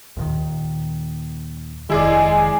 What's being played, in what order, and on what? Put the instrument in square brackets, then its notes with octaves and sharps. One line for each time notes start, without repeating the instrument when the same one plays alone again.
[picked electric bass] D#2 A#2 D#3
[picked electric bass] F1 D#3 [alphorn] G#3 [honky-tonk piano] E4 G#4 D5